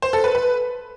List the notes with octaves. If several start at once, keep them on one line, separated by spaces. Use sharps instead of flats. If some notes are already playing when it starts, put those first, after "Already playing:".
C5
A4
B4
B4